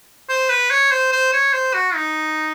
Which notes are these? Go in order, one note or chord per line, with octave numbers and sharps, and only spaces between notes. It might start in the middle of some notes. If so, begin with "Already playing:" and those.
C5
B4
C#5
C5
C5
C#5
C5
F#4
D#4